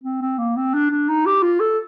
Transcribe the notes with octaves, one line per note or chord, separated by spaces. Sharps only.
C4
C4
A#3
C4
D4
D4
D#4
G4
F4
A4